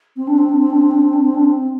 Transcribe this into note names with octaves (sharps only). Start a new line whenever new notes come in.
C4
D4
C4
D4
C4
D4
C4
D4
C4
D4
C4
D4
C4